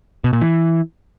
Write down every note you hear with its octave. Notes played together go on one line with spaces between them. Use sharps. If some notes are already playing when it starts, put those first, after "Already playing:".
B2
A#2
E3